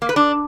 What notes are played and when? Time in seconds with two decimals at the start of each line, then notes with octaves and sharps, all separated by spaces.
0.02 A#3
0.09 B4
0.16 D4